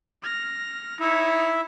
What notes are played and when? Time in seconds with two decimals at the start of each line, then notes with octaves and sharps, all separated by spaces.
0.22 F6 A#6
1.00 D#4 E4 C#5 E5